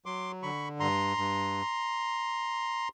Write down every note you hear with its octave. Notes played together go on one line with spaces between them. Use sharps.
F#3 C6 D6
D3 B5 C#6
G2 A#5 C6
G2